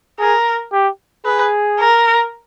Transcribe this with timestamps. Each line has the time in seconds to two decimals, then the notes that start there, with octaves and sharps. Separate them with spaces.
0.19 G#4 A#4
0.72 G4
1.25 G#4 B4
1.79 A#4